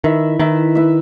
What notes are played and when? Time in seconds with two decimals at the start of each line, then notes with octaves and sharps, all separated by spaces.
0.04 D#3 E4 B4 E5
0.39 D#3 E4 B4 E5
0.75 E4 B4 E5